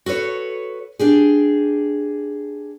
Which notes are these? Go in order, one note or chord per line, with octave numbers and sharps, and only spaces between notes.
F#4 A4 B4 C#5
D4 G4 G#4